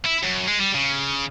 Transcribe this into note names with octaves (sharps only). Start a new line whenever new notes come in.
E4
F#2
G#3
G3
C#3